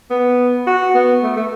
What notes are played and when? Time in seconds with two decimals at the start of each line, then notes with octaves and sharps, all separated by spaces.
0.10 B3
0.67 F#4
0.95 B3
1.23 A3
1.37 A3